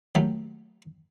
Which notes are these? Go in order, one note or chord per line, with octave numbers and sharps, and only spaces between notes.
D#2 F#3 G3 A3